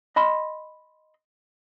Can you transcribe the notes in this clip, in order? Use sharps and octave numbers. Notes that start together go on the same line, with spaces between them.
D#5 B5 C6